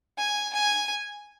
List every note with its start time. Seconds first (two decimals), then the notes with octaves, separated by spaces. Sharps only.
0.18 G#5
0.53 G#5